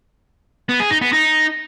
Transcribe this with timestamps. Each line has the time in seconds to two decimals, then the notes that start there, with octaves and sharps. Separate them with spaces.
0.69 B3
0.80 G#4
0.91 D#4
1.02 B3
1.13 D#4